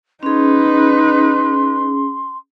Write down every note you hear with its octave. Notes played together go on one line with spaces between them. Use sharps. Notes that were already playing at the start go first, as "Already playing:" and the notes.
C#4 D#4 G#4 B4 C6